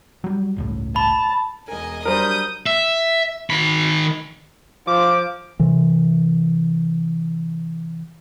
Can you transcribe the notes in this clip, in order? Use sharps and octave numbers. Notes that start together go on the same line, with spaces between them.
F#3 G3
G1 C#2 A2
A5 B5
E1 A#4 D#5 G#5
F#3 G3 D4 A#4 C5 D#6 G6
E5
D#3 B5
F3 D6
C3 E3